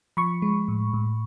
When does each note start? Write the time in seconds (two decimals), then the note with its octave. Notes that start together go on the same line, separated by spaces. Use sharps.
0.17 F3 B5 C#6
0.42 G#3
0.68 A2
0.94 A2